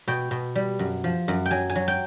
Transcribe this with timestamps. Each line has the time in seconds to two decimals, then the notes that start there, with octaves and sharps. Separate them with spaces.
0.08 B2 G5
0.31 B2
0.55 G3
0.79 F#2
1.04 F3
1.28 F#2
1.46 G5
1.51 F#3 G#5
1.70 G#5
1.76 F#3
1.88 G5